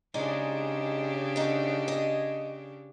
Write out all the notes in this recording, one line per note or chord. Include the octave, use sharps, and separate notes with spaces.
C#3 G#3 D4 D#4 G4 D5
D3 D#4
D#5